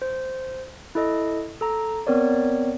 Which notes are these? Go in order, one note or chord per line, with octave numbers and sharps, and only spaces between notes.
C5
E4 A4 D#5
A4 A#5
B3 C4 A#4 C#5 D5